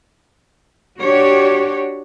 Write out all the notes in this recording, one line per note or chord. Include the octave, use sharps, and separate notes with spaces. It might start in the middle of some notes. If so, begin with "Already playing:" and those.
D4 F#4 G4 C#5